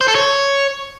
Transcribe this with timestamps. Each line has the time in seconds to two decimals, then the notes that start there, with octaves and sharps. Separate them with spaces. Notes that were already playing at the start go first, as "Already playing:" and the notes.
0.01 C5
0.08 A4
0.15 C#5